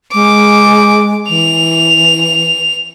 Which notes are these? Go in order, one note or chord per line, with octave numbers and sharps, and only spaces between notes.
G#3 D6
E3 F7